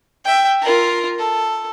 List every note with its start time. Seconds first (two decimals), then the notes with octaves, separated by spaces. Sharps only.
0.25 E5 G5
0.62 F4 A#4
1.18 A4